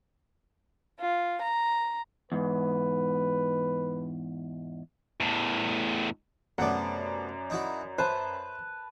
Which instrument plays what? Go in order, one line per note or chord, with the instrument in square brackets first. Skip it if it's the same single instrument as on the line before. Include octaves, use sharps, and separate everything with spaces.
[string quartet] F4
A#5
[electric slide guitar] E2 G#2 [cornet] B4
[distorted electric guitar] E2 A2
[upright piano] F#2 D5 [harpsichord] C3 A3 B3 [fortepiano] F#5
[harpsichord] D#4 E4 F#4
[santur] B4 A5 [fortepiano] C5 [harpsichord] E5